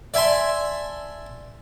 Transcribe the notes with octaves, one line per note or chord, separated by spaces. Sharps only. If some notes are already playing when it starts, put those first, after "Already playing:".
D5 E5 G#5 A5 C6